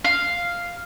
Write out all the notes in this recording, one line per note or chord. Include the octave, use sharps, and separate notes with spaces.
F5